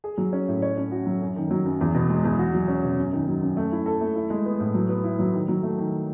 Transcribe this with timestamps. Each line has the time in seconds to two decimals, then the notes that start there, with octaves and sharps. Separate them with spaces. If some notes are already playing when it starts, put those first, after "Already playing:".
0.04 G#4
0.18 F#3
0.33 C#4
0.48 A2
0.62 C#5
0.77 C#4
0.91 F#4
1.06 F#3
1.21 F#2
1.36 D#3
1.51 F#3
1.66 F#2
1.81 E2
1.95 B2
2.10 G#3
2.24 E2
2.39 F#4
2.54 F#3
2.68 C#4
2.83 B2
2.98 F#2
3.12 D#3
3.27 F#3
3.42 F#2
3.57 A3
3.72 E4
3.86 A4
4.01 A3
4.15 E4
4.30 G#3
4.46 B3
4.60 A2
4.74 F#3
4.89 B3
5.04 E4
5.19 F#3
5.33 D#3
5.48 F#3
5.63 A3
5.78 D#3